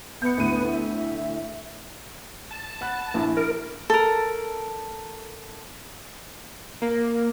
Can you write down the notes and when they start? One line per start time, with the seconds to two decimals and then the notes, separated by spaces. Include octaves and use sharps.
0.22 B3 G6 C#7
0.38 D2 A2 D#7
0.73 E5
2.51 A5
2.81 F#5 B5 F#6
3.14 A#1 E4
3.37 A#4
3.90 A4 A#4
6.82 A#3